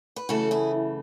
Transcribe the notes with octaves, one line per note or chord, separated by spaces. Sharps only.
B4
F#2 C#3 E3 A3 F#4 A4
E4 G#4